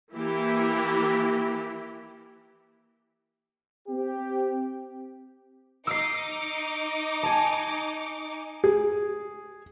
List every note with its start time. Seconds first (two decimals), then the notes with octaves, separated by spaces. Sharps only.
0.14 E3 A#3 E4 G4
3.88 C4 G4
5.87 D#4 D6 E6 C7
7.23 G#5 A5
8.64 G#4